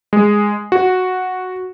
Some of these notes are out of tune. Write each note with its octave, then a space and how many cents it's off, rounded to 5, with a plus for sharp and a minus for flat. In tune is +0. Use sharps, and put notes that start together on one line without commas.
G#3 -5
F#4 -5